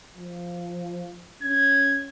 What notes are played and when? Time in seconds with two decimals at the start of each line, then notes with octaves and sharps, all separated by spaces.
0.16 F3
1.42 C#4 G#6